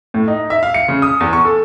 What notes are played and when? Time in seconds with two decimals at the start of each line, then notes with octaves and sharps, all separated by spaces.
0.14 A2
0.28 D#4
0.50 E5
0.63 F5
0.74 C#7
0.88 C#3
1.02 D#6
1.20 E2
1.33 C#6
1.45 A4